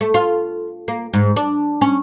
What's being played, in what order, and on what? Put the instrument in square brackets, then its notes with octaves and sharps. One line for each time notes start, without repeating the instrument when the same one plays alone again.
[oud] A3
F4
A#3
G#2
D4
C#4